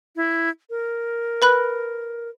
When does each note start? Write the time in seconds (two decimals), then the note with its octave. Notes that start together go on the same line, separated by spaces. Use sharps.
0.16 E4
0.70 A#4
1.42 B4 B5 F#6